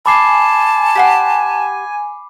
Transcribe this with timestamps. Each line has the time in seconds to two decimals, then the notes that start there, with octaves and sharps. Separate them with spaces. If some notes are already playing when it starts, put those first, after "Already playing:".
0.06 G#5 A5 B5 D6 C7
0.95 G4 F#5 C6